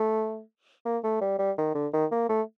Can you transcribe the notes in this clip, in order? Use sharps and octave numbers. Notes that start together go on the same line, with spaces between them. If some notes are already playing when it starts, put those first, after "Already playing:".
Already playing: A3
A#3
A3
G3
G3
D#3
D3
D#3
A#3
A3